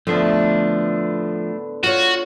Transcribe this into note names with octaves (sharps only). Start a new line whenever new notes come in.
A2 D3 F3 A3 B3 D4
F4 F#4 C#5